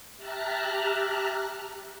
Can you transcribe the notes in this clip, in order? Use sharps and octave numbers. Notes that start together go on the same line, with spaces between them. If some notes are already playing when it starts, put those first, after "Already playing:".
G4 E5 A5 A#5 F6 F#6